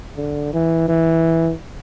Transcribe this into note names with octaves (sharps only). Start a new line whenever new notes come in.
D3
E3
E3